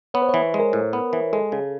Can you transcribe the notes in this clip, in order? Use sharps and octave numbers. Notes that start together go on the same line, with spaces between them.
B3 C#5
C5
E3 C#5
G#3
A#4
A2
B3
E3
G#3 A4
C#3 G#4